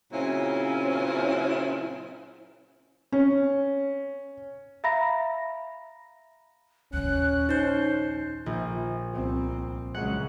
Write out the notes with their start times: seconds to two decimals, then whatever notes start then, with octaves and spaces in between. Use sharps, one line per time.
0.13 A#2 C#3 F#3 C4 C#4 E4
3.12 C#4
4.84 E5 F5 A#5 B5 A#6
6.93 A#1 D#2 C#4 F#6
7.49 D#4 C5 G6
8.46 A#1
9.13 C2 C4
9.94 C#2 F#3 G#3 F#5